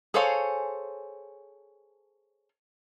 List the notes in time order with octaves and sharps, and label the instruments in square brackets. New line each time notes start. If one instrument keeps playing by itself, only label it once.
[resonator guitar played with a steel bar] G#4 A4 C5 C#5 F5 G#5